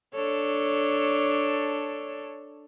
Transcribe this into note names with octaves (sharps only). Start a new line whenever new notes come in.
D4 A4 C#5